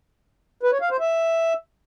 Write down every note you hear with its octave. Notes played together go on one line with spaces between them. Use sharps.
B4
C#5
F5
C5
E5